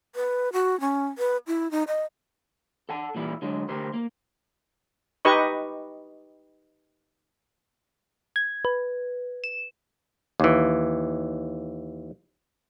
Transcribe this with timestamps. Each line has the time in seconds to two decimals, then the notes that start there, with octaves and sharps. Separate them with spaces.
0.15 B4
0.53 F#4
0.80 C#4
1.18 B4
1.47 E4
1.71 D#4
1.88 D#5
2.89 A4 F#5 A5
3.15 A#2 E3 G3 E4
3.42 D3 F#3 G#3
3.69 D2 G4 A#4 C5
3.94 A#3
5.25 D#4 G4 B4 D#5 C#6
8.36 G#6
8.65 B4
9.44 E7
10.40 D#2 E3